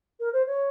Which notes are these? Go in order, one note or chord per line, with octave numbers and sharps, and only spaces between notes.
A#4
C5
C#5